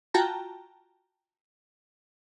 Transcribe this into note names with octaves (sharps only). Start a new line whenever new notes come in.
F4 F#4 G5 A5 A#5